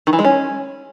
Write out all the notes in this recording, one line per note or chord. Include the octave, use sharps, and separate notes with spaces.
D#3
E3
G#3
C#4